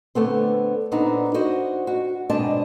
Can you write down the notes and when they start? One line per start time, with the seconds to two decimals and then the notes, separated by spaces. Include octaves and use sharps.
0.15 D3 A3 B3 C4
0.92 A#2 B3 C4 D4 D#4
1.34 F#4 C5 D#5
1.87 F#4
2.29 G#2 B2 C4 D4 D#5 A5